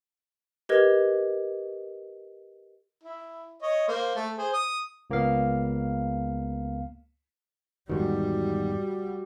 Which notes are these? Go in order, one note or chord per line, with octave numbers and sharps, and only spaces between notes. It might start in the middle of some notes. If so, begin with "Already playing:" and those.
G4 A#4 B4 D#5 G#6
E4
C#5 D#5
A#3 C5
A3
G#4 C5
D#6
C#2 A#3 B3 F5
E2 G#2 D#3 G3 F#4